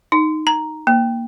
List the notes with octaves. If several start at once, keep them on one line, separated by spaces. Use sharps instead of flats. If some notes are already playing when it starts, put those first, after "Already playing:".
D#4
A#5
A#3